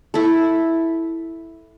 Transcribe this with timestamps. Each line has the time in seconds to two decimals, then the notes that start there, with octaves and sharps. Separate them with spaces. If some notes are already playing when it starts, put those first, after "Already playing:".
0.14 E4 A4